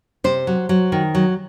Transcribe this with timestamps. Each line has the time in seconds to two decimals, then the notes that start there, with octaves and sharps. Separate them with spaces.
0.24 C3 C5
0.47 F#3
0.69 F#3
0.92 D#3
1.15 F#3